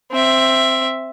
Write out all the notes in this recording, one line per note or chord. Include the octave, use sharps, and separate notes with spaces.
C4 E5